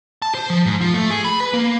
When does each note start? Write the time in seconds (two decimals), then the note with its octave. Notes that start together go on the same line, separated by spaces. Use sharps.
0.22 A5
0.35 C5
0.50 F3
0.66 G#2
0.81 F3
0.94 A3
1.10 G#4
1.25 B5
1.40 B4
1.53 A#3